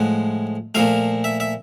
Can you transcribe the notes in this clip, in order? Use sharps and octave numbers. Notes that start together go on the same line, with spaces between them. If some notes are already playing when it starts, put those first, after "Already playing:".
Already playing: A2 F3 G#3 F#5
A#2 F3 A3 F5
E5
E5